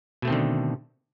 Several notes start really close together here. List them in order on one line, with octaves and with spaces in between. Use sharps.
B2 A3 C4 D#3 D3